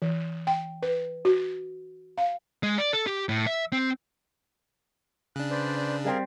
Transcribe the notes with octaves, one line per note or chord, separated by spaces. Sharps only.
E3
G5
B4
F#4
F5
G#3
D5
A4
G4
A2
E5
C4
C#3 D4 F#6
B4 C5 D5
G3 C4 G#4 A#4 F5